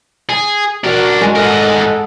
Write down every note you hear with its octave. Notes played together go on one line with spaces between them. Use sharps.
G#4
D4 F#4 A#4
G#3
G#2 A4 A#4 D#5 F#5